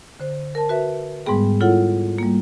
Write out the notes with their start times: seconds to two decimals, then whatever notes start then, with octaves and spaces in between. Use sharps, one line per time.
0.20 D3 C5
0.55 A#4 A5
0.69 F#4 B4 E5
1.26 G#2 G3 G#3 B3 G#4 G5
1.60 E4 F4 A4 C#5 F#5
2.18 G3 A#3